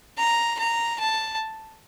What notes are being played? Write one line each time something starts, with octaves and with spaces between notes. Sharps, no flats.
A#5
A#5
A5